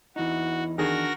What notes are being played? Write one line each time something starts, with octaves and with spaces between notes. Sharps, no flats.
E2 D#4 E4 F#4
D#3 D4 F#4 G#4 A#4 A#6